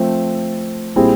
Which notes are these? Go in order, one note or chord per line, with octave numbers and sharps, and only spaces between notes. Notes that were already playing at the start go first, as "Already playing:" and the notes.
Already playing: F3 A3 C4
A#2 G3 C4 E4 G#4